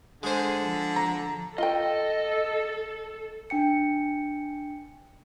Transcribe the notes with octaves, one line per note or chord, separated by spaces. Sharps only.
D3 G#3 G#4 C5
F3
A#5
F4 A4 D#5 G5
D4 G5 C#7